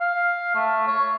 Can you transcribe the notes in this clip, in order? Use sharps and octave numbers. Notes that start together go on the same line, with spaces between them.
F5
A3
C#5